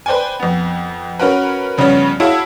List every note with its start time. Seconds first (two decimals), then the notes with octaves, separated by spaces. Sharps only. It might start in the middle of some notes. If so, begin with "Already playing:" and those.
0.06 B4 C5 D5 G5 G#5
0.40 F2 B3
1.20 C#4 F#4 A#4 B4
1.78 G2 C#3 F3 B3 C#4
2.20 E4 F#4 G#4 C#5 F5 A5